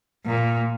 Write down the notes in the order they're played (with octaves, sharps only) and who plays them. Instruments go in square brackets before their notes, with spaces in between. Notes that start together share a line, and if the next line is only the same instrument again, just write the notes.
[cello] A#2